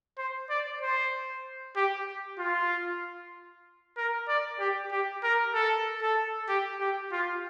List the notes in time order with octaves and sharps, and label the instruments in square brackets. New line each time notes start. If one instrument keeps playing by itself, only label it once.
[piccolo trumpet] C5
D5
C5
G4
F4
A#4
D5
G4
G4
A#4
A4
A4
G4
G4
F4